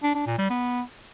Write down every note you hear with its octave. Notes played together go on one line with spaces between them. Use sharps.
D4
D4
A#2
G3
B3